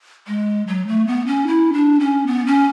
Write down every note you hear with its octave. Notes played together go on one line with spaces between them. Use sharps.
G#3
F#3
A3
B3
C#4
E4
D4
C#4
B3
C#4